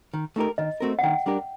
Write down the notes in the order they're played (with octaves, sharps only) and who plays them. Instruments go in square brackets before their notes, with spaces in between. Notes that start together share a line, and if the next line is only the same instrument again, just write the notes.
[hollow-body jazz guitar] D#3
A3 D#4 G4 A#4
[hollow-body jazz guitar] D#3 [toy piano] D#5
[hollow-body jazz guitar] A3 C4 F#4 A#4
[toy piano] F#5
[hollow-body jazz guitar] D#3 [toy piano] G5
[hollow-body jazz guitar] G3 D4 G4 A#4